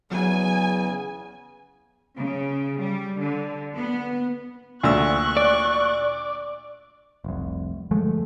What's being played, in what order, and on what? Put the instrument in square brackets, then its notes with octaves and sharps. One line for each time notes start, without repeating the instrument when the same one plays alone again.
[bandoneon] E2 C#3 [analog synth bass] F#3 [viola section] G#5
[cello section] C#3
G3
D3
B3
[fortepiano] D2 [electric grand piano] A#2 E6 [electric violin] C#6 F#6
[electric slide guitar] D5
[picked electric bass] F1 C2
G1 F3 G#3 A3